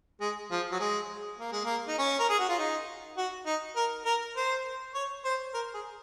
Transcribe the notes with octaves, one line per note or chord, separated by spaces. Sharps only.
G#3
F3
F#3
G#3
A#3
G#3
A#3
D#4
C#4
A#4
G#4
F#4
F4
D#4
F#4
D#4
A#4
A#4
C5
C#5
C5
A#4
G#4